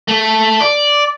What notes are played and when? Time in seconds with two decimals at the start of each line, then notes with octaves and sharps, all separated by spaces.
0.08 A3
0.60 D5